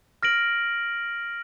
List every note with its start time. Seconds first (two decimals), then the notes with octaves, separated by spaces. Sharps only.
0.23 F6 A#6 D7 F#7